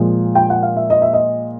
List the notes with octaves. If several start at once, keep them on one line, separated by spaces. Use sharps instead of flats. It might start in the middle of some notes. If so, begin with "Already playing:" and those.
Already playing: A#2 F3 G#3
G5
F#5
F5
E5
D#5
E5
D#5